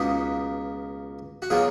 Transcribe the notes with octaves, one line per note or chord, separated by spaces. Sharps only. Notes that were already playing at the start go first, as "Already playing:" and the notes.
Already playing: C#2 B2 A#3 D#4 F#4
F#4
B2 F#3 A#3 F4 G#4